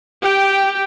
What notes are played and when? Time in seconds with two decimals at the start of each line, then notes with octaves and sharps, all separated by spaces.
0.22 G4 G5